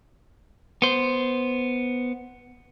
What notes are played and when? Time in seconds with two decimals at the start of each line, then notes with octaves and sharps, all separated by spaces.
0.82 B3 C5